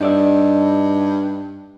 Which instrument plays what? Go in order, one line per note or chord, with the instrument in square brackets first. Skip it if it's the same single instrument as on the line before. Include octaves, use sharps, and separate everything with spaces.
[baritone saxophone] G2 [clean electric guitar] D#4 D5 E5